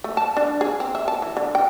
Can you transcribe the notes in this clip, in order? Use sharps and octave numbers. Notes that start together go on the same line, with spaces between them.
A3
A5
D4
G#4
C4
E5
A5
E3
D3
G5